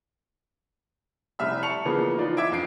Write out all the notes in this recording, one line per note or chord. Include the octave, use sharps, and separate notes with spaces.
F1 C2 E5 F6
A5 C#6 C#7 F7
C#3 E3 F3 A#3 B3
E3 F3 D#4 F4 D5
E5 D6 G#6 D7
F2 D4 C7 D7